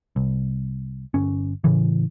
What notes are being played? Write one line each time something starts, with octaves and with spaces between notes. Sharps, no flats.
C2
G1 C#4
A2 C#3 E3